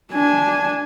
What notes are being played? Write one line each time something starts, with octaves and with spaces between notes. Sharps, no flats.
D4 G#5